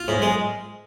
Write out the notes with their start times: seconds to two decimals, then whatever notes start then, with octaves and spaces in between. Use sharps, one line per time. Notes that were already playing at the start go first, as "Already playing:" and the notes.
Already playing: F4
0.08 G#2
0.22 G#3